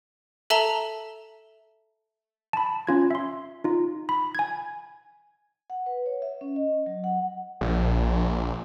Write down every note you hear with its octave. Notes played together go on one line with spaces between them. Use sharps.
A4 E5 A5 A#5 F7 G7
A5 B5
C#4 F4 G#6
E5 C6
D#4 F4
B5
G#5 G#6
F#5
B4
C#5
E5
C#4
D#5
F#3
F#5
A#1